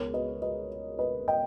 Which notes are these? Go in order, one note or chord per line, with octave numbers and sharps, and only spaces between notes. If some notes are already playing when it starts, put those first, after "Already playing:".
Already playing: C#2 B2 G#3 A#4 C#5
B4 D#5
B4 D#5
B4 D#5
D#5 G5